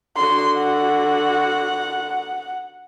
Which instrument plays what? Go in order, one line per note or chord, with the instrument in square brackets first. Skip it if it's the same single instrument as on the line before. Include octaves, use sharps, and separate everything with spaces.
[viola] D3 F#4 [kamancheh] C6
[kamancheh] F#5